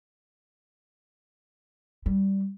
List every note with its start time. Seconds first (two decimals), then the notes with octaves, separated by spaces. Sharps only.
2.06 G3